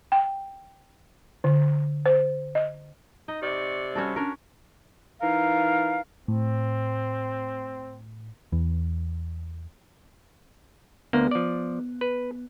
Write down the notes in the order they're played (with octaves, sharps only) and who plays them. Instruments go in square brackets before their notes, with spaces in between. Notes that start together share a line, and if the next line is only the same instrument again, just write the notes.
[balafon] G5
D3
C5
D#5
[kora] D#4 [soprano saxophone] D#5
[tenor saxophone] C3 [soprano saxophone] D5 [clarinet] C#6
[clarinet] G3 [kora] C#4 F#4 A4
[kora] C#4 A#4 [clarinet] D4
[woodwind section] E3 D#4 A#4 F5
[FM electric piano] A2 [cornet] C4
[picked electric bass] E2 E3
[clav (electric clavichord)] D2 A#3 [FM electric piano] B3
[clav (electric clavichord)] F3 D5
B4